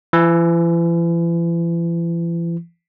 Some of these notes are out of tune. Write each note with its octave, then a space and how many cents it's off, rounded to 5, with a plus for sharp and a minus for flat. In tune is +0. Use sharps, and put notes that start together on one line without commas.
E3 +40